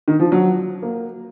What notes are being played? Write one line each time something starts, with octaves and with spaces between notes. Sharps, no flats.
D#3
F3
F#3
A#3